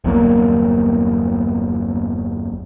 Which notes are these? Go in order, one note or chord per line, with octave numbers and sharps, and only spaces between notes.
G1 E2 F#3 A#3